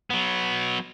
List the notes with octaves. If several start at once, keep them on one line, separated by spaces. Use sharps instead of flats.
F#3 B3